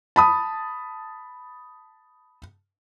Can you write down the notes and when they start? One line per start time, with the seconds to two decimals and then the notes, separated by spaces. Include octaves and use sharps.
0.16 A5 B5 D#6